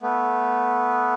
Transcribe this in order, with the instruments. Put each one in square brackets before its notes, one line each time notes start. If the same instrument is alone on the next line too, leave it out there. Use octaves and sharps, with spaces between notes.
[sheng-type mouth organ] A3 B3